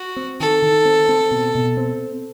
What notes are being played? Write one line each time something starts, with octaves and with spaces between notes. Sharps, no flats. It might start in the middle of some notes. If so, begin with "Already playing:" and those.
Already playing: F#4
C4
D#3 A4
D#3
C4
C4
B2
B2
C4